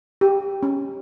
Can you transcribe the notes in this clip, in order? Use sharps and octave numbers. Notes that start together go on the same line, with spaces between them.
G4
C#4